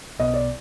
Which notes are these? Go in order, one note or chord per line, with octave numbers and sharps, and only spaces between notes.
B1 B2 B3 D#5
D5